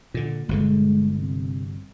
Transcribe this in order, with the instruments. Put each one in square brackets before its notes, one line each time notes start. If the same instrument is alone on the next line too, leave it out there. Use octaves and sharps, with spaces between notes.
[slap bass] A#2 D3
[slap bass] G1 B2 D3 [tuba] G#3
[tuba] C3